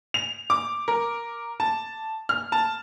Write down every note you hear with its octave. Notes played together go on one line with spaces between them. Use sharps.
F7
D6
A#4
A5
F6
A5